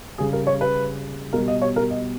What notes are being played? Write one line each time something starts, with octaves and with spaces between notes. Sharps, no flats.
C#3 G3 G#4
A#4
C#5
B4
B2 G3 A#4
D#5
C#5
A#4
D#5